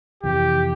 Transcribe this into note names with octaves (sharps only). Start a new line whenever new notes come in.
F2 C3 E3 G4